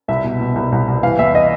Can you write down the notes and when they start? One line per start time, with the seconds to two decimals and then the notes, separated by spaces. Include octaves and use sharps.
0.08 C2 E5
0.24 B2
0.40 B2
0.55 C2
0.72 C2
0.88 C2
1.03 E3 F5
1.19 E2 E5
1.35 D#5